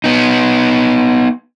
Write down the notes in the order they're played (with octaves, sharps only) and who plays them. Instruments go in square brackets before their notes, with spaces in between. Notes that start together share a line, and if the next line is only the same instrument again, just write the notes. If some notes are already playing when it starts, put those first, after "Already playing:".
[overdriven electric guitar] B3 D#4